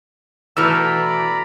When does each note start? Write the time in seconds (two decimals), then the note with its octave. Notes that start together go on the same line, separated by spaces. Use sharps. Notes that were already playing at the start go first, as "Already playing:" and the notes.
0.57 B2 E3 A3 D5 A#5 B5 E6 F6